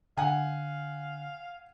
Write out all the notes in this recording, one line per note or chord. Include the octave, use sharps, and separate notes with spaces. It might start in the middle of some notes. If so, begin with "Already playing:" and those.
D3 F5 F#5 G#5